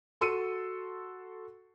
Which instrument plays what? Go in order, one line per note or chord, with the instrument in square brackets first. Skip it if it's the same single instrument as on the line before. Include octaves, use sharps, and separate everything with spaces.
[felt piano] F#4 A4 C6 E6 C#7 D#7